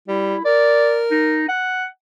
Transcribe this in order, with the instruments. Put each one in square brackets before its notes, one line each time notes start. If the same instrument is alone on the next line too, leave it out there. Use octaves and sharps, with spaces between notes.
[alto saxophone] G3 [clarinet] E4
[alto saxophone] A#4 [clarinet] D5
[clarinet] D#4
F#5